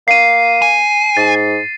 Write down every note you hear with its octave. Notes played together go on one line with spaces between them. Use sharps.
A#3 C7 D#7
G#5
G#2 A6